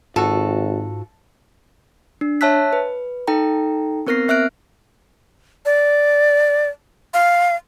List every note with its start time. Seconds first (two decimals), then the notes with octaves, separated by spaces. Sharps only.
0.16 G#1 G#2 F4 F#4 A4
2.21 D4
2.41 C#5 E5 A5 E6 F#6 B6
2.73 B4
3.27 D#4 A4 G5 A#5
4.07 B3 C4 A#4 F6 A#6 C7
4.28 C4 E5 F6 F#6 D7
5.65 D5
7.14 F5